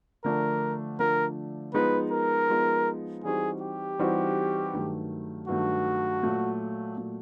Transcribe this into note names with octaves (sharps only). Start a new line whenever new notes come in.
D3 F3 A3 D4 A#4
D3 F3 A3 D4 A#4
F3 G#3 B3 D#4 B4
A#4
F3 G#3 B3 D#4
E3 G3 C4 D#4 F#4 G#4
G4
E3 G3 C4 D#4 F#4
G2 D#3 F#3 A3
G2 D#3 F#3 A3 F#4
A#2 F#3 A3
A#2 F#3 A3